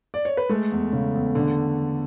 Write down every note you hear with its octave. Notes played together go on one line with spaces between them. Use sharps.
D5
C#5
B4
G#3 A3 A4
E2
C#3
E2
D3